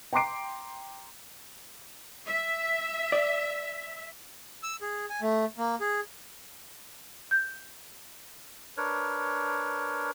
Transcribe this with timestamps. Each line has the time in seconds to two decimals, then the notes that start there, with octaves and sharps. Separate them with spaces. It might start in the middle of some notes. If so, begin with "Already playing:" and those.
0.13 G5 A#5 C6 D6 C7 D7
2.27 E5
3.12 D5
4.63 E6
4.81 G#4
5.10 G#5
5.21 A3
5.58 A#3
5.81 G#4
7.31 G6
8.77 D4 A#4 B4 C#5